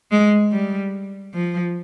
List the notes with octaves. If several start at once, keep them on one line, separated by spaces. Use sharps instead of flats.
G#3
G3
F3